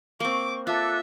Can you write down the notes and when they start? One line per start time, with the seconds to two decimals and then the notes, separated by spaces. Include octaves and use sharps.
0.20 A#3 C4 C#6 D6
0.67 F4 A4 E5 D6 F#6